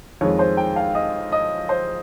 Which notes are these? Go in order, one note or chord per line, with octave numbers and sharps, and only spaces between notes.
F2 D#3 G#3 C#5
C5
G5
F5
D#5
D#5
C5